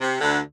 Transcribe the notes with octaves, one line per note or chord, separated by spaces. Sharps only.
C3
D2 D3